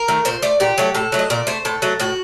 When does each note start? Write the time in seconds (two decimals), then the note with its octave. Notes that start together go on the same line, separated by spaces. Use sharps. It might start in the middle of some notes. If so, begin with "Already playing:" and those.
Already playing: A#4
0.08 D#3 A3
0.25 A#2 C5
0.42 A3 D5
0.60 A#2 G4
0.78 F#3 A3
0.95 A2 A4
1.12 F#3 A3
1.19 D#5
1.30 A#2 D5
1.47 A3 C5
1.65 A2 A4
1.82 F#3 A3
2.00 A2 F#4